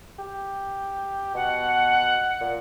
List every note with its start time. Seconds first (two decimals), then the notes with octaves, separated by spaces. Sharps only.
0.19 G4
1.35 B2 F#5
2.41 A#2